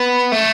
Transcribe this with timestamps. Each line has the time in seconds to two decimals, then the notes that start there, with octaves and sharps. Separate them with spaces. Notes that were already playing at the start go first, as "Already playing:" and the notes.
Already playing: B3
0.32 A3